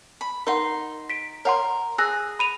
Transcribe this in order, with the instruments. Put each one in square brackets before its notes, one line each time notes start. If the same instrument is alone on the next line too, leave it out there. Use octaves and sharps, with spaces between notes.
[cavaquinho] B5
[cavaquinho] D#4 C6 [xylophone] A#4 F#5
[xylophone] B6 D7
[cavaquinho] A#4 [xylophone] C#5 F#5 C6
[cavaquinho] G#4 [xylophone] E6 F#6 A#6
[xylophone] B5 D#7 F7